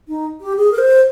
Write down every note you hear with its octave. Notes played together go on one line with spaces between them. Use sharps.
D#4
G4
G#4
A#4
C5